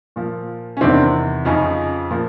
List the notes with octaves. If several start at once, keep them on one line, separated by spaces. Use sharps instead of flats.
A#2 F3
C#4
E2 C3 D#3 C4 D4
F2 C#3 F3 C#4 D#4
A#2 F3